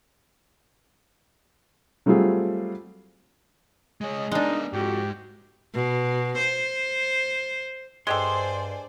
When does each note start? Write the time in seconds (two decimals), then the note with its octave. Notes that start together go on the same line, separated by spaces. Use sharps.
2.06 F#3 G3 A3 C4 F4 G#4
4.01 G#3 G#4 C#5 D#5
4.32 G#3 B3 D4 D#4 A#4
4.73 F2 G#2 F#4 G4
5.74 B2
6.38 C5
8.07 G2 G#3 G4 A4 C5 D5 G#5 C6